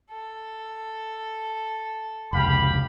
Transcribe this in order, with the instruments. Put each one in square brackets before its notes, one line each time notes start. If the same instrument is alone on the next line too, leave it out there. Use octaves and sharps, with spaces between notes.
[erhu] A4
[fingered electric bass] F1 C#2 [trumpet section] G4 F5 B5